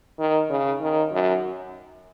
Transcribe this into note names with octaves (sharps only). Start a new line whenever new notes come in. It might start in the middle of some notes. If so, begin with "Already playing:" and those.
D#3
C#3
D#3
F#2